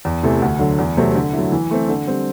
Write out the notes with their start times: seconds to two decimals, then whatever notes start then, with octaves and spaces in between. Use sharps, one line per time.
0.05 E2
0.23 C3 E3 A3
0.42 D2
0.59 D3 F#3
0.79 E2
0.97 C3 F#3 A3 C4
1.15 D3
1.33 F#3 A3 E4
1.52 E3
1.71 A3 C4
1.88 D3
2.07 G3 C4